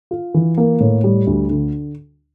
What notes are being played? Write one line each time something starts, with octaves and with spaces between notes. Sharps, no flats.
F4
E3
A#3
A2
G3
D2
D3